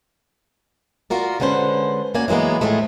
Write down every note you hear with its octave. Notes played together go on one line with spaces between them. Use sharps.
F4 F#4 A#4 D5
D3 G#3 C#4 B4 C5
A#3 C#4 F#4 D5 G#5
E3 F#3 G#3 A#3 B3
A2 F3 G#3 A3